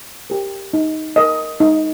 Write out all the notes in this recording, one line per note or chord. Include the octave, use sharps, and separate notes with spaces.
G4 A#4
D#4
A#4 D#5
D#4